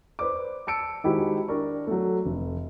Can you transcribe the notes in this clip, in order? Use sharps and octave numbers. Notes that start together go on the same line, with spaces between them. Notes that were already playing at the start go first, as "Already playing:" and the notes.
B4 C5 D5 D6
A5 E6 C#7 D7
D#3 G#3 E4 F#4 G4 C5
D4 A#4 D5 C#6
F#3 A3
F1